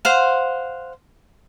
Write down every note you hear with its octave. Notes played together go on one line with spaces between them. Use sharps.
C5 F5 F#5